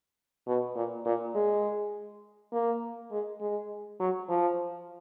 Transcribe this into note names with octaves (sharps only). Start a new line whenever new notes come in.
B2
A#2
A#2
G#3
A#3
G#3
G#3
F#3
F3